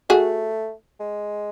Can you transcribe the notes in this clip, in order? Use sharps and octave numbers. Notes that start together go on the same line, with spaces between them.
A3 F#4 G#4
G#3